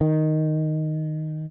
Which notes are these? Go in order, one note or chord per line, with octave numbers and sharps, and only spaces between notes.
D#3